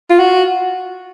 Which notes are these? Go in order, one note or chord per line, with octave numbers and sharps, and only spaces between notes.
F4
F#4